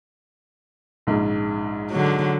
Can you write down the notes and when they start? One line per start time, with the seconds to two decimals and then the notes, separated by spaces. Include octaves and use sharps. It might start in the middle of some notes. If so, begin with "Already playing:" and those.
1.07 A#1 G#2 C#3
1.90 D3 F#3